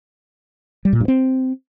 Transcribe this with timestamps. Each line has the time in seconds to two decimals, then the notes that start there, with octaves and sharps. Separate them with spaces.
0.85 G3
0.93 A#2
1.00 G2
1.08 C4